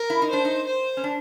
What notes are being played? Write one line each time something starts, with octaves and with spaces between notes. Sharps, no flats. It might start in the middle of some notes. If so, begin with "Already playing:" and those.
Already playing: A#4
E4
D#4
D4 C5
D#4
C5
C#4
D4